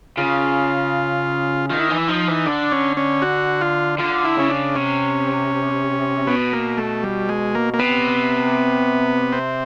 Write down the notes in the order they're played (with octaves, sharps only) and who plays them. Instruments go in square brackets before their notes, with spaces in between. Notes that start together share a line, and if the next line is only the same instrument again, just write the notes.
[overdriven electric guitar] C#3 [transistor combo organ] F4
[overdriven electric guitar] D#3 [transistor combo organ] F4
[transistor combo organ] E4
[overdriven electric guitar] E3 [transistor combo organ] D#4
[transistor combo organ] E4
[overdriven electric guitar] F3 [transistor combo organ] D#4
[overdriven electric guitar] E3
[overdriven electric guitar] D3 [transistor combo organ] D4
[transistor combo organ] C#4
C#4
F#4
F4
[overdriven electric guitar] D3 [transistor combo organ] F4
[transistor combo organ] E4
[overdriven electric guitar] C#3 [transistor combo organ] C#4
[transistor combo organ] D4
[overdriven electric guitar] C3 [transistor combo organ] C#4
[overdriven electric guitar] B2 [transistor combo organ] B3
[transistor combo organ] A#3
A3
G3
G#3
A#3
A#3
[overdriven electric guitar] C3 [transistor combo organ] B3
[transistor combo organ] C4